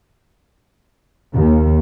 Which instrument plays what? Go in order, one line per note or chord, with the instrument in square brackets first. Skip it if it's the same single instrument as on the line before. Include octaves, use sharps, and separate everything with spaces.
[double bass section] D#2